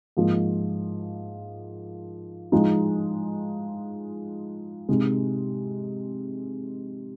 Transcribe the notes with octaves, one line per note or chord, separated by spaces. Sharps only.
G#2 F3 A#3
F3 G#3 D#4
C3 G#3 D#4